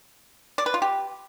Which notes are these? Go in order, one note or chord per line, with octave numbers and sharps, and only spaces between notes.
D5
B4
F4
G4